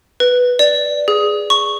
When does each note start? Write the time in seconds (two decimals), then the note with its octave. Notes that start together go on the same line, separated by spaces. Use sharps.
0.20 B4
0.59 D5
1.08 G#4
1.50 C#6